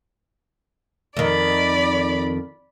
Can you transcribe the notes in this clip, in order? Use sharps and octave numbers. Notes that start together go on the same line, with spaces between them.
F2 D#3 D5 B5